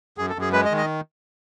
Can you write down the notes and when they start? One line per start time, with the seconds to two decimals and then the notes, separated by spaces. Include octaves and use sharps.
0.18 F#2 G#4
0.29 A4
0.36 F#2
0.41 G#4
0.53 G#3 B4
0.65 D#5
0.71 D#3
0.77 D#5